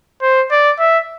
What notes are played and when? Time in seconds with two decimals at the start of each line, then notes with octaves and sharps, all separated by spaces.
0.22 C5
0.51 D5
0.79 E5